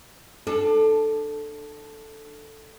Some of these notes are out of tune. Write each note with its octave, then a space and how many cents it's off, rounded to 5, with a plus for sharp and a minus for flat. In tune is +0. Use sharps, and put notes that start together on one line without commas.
D4 +30 A4 +0